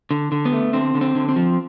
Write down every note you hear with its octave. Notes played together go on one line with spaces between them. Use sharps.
D3
D3
B3
A3
D3 C4
D3
C4
D3
C4
F3